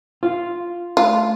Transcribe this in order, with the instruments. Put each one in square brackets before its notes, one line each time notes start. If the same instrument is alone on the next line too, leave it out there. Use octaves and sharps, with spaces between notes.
[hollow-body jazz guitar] F4
[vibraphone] A3 [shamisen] F4